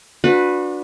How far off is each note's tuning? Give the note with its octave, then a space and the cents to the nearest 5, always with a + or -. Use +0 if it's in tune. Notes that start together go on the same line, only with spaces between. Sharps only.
D4 +0 F#4 -35 B4 +0